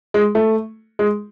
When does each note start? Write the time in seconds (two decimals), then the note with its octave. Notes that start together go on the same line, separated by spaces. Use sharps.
0.14 G#3
0.35 A3
0.99 G#3